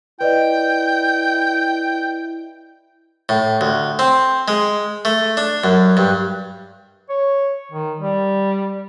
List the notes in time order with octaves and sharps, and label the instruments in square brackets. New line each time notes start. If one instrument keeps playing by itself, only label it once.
[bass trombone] E4 [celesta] B4 D5 D#5 [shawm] G5
[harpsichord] A2
D2
C4
G#3
A3
D4
F#2
G2
[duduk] C#5
D#3
G3